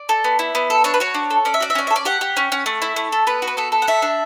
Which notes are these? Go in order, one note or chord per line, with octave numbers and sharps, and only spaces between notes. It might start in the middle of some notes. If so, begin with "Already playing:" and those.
Already playing: D5
A4
B3
E4
B3
A4
D4 C#5
B4
F#4 C#5
D4
A4
C#4 D5
E5
F#4 D5
E5
C#4 D5
A4 E5
D5
G4 F#5
G4
C#4
C#4
A3
E4
A3
A4
B3 B4
F#4
B4
B3 A4
A4
F#5
A3 E5
D4